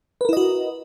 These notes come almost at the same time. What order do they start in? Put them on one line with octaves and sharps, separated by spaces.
B4 A#4 E4 D#5 F#4